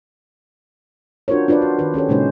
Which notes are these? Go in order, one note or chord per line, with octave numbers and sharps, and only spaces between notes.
D4 F4 F#4 A#4 C5 C#5
D4 F4 B4 C5 D5
F#4
D#3 B4
C#4 G4 A4 C#5
A#2 C#3 G#3 C#4 D#4 C5